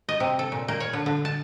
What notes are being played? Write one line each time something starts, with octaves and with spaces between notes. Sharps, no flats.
D#5
C3
A4
A#2
A#3
C#5
D3
D3
A5